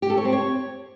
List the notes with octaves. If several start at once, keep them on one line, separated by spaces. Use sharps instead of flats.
G4
A4
C#5
C4
C#5